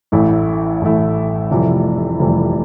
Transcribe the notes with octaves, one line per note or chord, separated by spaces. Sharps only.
A1 A2 E3 A3 E4
A1 A2 E3 A3 E4
F1 F2 C3 E3 G3
F1 F2 C3 E3 G3